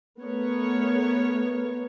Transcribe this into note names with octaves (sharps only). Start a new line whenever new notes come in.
A3 B3 A#4 C#5